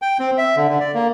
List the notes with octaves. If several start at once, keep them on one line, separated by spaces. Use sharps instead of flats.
G5
C4
E5
D3
D3
D5
A#3